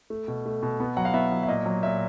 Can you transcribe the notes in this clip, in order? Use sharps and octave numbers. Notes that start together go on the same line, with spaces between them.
A3
B2
A3
B2
B3
F#3 F#5
F5
B3 E5
F#3
E5
A#2 D#5
F#3
A#2 E5